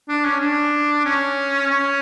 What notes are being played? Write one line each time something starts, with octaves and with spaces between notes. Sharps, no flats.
D4
C#4
D4
C#4
C#4